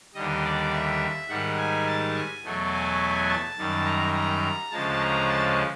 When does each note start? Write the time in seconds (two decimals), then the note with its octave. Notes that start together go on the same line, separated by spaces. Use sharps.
0.15 D#2 D3 G3 D#5
0.44 D5
0.72 E5
1.29 G#2 D#3 G3 F#5
1.58 G#5
1.86 A5
2.15 G#5
2.44 E2 B2 F#3 A3
2.72 G#5
3.29 A5
3.58 F#2 D#3 G3
3.86 A#5
4.14 A#5
4.71 D2 C#3 F3 G#3 A5
5.00 A#5
5.28 A5